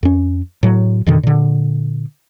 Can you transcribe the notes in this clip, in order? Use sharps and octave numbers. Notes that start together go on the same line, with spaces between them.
F2 C#4
A2 F#3
F2 B2 D3 D#3
A#2 D3